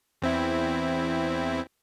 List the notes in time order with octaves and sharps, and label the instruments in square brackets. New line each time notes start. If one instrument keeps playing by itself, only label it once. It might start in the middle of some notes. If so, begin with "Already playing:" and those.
[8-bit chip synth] E2 C4 E4